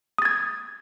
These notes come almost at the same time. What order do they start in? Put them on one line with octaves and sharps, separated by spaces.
D#6 A6 G#6